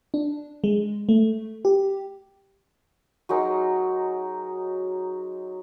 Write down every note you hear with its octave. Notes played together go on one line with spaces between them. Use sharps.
D4
G#3
A3
G4
F#3 G#3 D#4 A#4